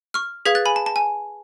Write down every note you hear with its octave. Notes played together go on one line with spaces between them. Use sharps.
C#6 F6
G#4 B4 F5 G#6 B6
F#6 A6
G#5 B5
A5
A5
G#5